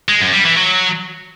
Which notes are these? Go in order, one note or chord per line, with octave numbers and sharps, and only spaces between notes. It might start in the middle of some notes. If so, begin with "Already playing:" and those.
G#3
F#2
G3
E3
F#3